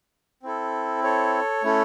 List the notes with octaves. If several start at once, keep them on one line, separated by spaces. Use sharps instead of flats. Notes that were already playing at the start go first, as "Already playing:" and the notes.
C4 E4 A4
A4 C#5
A3 C#4 E4 A4